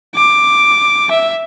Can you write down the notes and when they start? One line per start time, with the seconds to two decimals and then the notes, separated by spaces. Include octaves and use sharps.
0.15 D6
1.11 E5